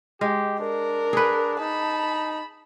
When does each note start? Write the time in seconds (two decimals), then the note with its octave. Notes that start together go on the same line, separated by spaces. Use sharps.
0.21 G#3 G4
0.60 D4 A#4
1.13 G#4 B4
1.60 D#4 A5 B5